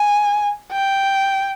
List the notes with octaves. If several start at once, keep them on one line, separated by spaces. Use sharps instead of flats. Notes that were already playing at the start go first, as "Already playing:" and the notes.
Already playing: G#5
G5